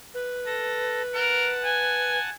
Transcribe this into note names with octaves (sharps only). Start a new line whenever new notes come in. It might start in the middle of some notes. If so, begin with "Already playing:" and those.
B4
A4 A#6
A#4 F#5 A5
G#5